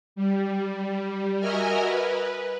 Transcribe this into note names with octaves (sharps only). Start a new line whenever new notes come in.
G3
F#4 A#4 D#5 E5 G#5 F6
B4